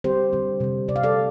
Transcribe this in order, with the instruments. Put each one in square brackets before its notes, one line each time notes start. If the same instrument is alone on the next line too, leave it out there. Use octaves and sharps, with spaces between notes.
[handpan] D3 G3 C4 G4 C5
D3 G3 C4
C3 G3 C4
C3 G3 C4 D5
F5
A4 D5